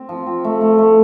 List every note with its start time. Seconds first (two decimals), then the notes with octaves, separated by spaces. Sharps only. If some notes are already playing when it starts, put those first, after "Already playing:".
Already playing: C4
0.09 F3
0.26 C4
0.44 A3
0.61 A3
0.78 A3